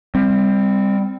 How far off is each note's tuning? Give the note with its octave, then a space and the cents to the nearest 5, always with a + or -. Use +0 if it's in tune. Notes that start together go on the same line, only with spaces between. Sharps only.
G3 +25 C4 +0